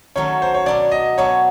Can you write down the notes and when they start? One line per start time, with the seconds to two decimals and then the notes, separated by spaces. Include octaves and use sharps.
0.16 D#3 F#3 A3 C#4 C#5
0.42 C5
0.54 C#5
0.66 B2 F#3 B3 D4 D5
0.92 D#5
1.18 B2 F#3 B3 D4 C#5